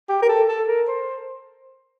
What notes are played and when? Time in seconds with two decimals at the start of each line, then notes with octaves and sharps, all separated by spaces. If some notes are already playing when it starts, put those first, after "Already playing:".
0.09 G4
0.22 A#4
0.29 A4
0.48 A4
0.68 A#4
0.88 C5